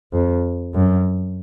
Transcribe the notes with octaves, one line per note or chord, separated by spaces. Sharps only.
F2
F#2